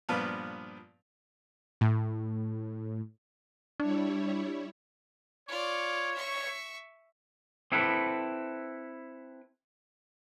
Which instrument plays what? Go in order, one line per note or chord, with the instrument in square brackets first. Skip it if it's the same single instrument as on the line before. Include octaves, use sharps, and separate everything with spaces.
[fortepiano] G2 A#2 F3 B3
[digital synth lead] A2
[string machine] G3 E4 C#5 [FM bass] D4
[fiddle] F4 D5 [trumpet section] C#5
[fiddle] E5 C#6
[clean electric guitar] C4 E4 A4 B4